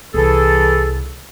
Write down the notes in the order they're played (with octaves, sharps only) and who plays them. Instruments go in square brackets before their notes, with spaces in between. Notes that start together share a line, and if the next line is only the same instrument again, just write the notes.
[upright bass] C2 [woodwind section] E3 G#4 A4